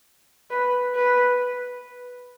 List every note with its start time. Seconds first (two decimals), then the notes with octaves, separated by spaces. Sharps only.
0.50 B4
0.95 B4